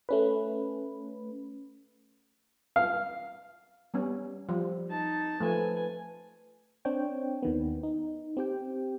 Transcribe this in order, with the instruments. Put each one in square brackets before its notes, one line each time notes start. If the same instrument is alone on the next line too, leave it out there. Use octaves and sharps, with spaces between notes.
[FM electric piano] A3 C#4 B4
[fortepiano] F5
[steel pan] G3 B3 C#4
F3 G3
[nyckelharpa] D#4 A5
[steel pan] F3 A3 [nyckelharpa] B4 G#5
[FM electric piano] C4 D4 C#5 G5
D#2 D#3 B3
D#4
C4 G4 G5